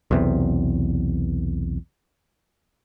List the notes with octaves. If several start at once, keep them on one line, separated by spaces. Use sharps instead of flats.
B1 E2 C3